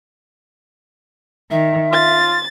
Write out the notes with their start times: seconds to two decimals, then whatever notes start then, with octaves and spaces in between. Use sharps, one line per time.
1.51 D#3 E5
1.91 F4 A6